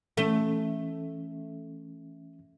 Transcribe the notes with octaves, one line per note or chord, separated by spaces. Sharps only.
E3 A3 C#4